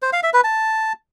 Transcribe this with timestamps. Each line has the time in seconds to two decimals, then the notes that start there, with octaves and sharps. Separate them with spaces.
0.02 C5
0.13 F5
0.23 E5
0.34 B4
0.44 A5